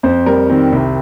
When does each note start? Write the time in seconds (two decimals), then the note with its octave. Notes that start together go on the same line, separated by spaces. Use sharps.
0.03 F2 C5
0.26 G3 A#4
0.49 D#3 C4
0.72 C2